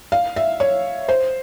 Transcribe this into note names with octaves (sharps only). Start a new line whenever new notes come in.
F5
E5
C#5
C5